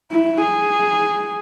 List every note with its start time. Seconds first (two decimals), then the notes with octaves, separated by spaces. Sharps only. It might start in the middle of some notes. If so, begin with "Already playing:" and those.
0.12 E4
0.41 G#4